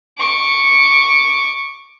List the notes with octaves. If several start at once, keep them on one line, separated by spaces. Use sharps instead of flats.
C#6 D6